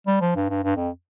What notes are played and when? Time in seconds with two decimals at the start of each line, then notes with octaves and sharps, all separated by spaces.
0.07 G3
0.21 F3
0.36 G2
0.50 G2
0.64 G2
0.76 F2